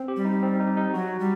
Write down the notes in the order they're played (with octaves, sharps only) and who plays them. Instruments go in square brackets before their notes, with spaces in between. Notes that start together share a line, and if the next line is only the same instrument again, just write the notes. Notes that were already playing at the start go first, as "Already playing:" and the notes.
Already playing: [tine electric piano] C4
G4
[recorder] G3
[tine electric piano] D#4
C4
D#4
D#4
[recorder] F#3 [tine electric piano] F#4
[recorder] G3